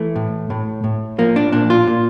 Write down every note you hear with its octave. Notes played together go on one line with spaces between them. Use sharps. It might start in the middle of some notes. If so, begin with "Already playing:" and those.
Already playing: E3 A3
A2
A2
A2
F3 A#3
D4
A#2 D4
F4
A#2